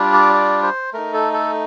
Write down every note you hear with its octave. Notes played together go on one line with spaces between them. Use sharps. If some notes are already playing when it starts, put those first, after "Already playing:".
Already playing: G3 D4 F4
D5
D5
C5
A3 D#4 A#4
A4
A4